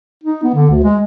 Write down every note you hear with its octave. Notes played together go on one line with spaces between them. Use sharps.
D#4
B3
D3
D2
G#3